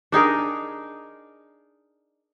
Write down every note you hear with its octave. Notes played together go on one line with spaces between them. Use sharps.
D4 D#4 G#4 A#4